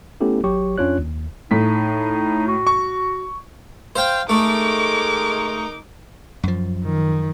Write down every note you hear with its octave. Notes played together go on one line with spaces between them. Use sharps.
A3 B3 C#4 E4 G4 A4
G#1 F#3 G4 C#5 C#6
F2 C#4 D4 F4 C#5 F#6
D#2
A2 D#4 B6
F#4
C#6
C5 F5 G5
G#3 A3 D#4 A#4 D6
F#2 F3
D#3